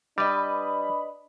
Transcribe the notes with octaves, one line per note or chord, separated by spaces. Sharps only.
G3 D4 B4 D#5 B5